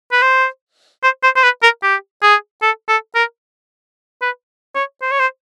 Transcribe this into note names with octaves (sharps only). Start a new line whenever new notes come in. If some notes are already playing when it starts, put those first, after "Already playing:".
B4
C5
C5
C5
C5
B4
A#4
G4
G#4
A4
A4
A#4
B4
C#5
C5
C#5
C5